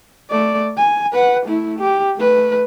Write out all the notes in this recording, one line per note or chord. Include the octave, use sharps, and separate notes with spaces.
A3 D5
G#5
B4 F#5
A3 E4
G4
A3 B4